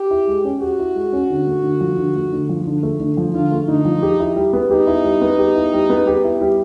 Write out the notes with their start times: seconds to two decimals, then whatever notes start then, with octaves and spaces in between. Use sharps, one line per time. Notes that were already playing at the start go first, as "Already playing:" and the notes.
Already playing: G4
0.11 E4
0.27 G#3
0.44 C#4
0.61 F#4 G4
0.79 E4
0.95 G#3
1.13 C#4
1.30 D3
1.47 A3
1.63 D3
1.81 F3
1.98 D3
2.15 A3
2.33 D3
2.49 F3
2.67 D3
2.83 A3
3.00 D3
3.17 F3
3.34 D3 F4
3.52 A3
3.68 D3 D#4
3.85 F3
4.02 G4
4.20 E4
4.36 G3
4.53 B3
4.71 D#4 G4
4.87 E4
5.04 G3
5.21 B3
5.38 G4
5.55 E4
5.73 G3
5.90 B3
6.07 G4
6.24 E4
6.41 G3